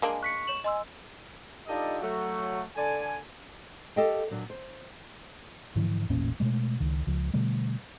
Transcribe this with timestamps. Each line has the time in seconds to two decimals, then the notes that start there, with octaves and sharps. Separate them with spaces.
0.02 G#3 A#3 D4 G#5
0.23 C#6 F#6 B6 C#7
0.47 C#5 E7 F#7
0.64 D#5 G#5 C6 E6
1.67 D4 D#4 F4 G4 A4 D#5
2.01 F#3 A3 F#4
2.76 D3 A4 D5 G#5
3.96 G4 A4 A#4 D#5 F5 G5
4.31 A#2 F#3 D4
4.50 C5
5.76 G#2 D3 E3 F3
6.10 E1 A1 A#2 C#4
6.40 B2 G#3 A3
6.80 C#2 D#3
7.07 C#2 F3
7.34 B2 D3 G3 A3